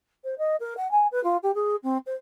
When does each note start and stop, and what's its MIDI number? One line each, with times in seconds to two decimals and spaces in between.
0.24 0.35 72
0.38 0.56 75
0.60 0.74 70
0.77 0.91 78
0.91 1.07 80
1.12 1.23 71
1.24 1.37 65
1.43 1.52 67
1.55 1.76 68
1.83 1.98 60
2.07 2.15 72